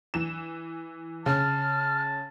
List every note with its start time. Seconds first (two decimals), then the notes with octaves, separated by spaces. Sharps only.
0.14 E3 E7
1.26 C#3 A5 F6